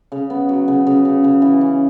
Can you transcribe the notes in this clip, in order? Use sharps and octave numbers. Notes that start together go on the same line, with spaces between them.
C#3
B3
F#3
C#3
C#3
C#3
C#3
E3
C#4